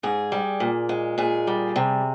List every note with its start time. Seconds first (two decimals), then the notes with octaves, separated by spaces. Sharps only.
0.03 G#2 G#4
0.32 G3
0.60 A#2
0.89 G#3
1.18 A#2 G#4
1.47 G3
1.76 C3